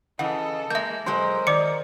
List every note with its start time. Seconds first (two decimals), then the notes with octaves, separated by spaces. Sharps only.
0.19 C#3 E3 A4 D#5 F#5
0.70 G#3 A#3 E5 G6
1.06 B2 F#3 G#3 A#4 C5 D#5
1.47 D#3 D5 D6 C#7